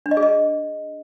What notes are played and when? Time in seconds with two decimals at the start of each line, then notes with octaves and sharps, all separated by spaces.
0.06 D4
0.11 D#5
0.17 G#4
0.23 D#5